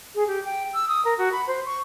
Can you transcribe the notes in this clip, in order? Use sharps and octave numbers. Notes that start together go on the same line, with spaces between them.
G#4
G4
G5
E6
D#6
A#4
F#4
B5
C5
C#6